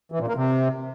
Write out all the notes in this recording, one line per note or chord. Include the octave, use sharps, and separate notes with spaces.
E3
A#2
A#3
C3